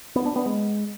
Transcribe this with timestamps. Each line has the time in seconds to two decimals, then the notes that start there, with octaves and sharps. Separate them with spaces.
0.16 B3
0.26 D4
0.36 B3
0.46 G#3